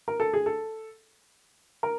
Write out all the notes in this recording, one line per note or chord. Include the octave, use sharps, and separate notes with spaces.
A#4
A4
G#4
A4
A#4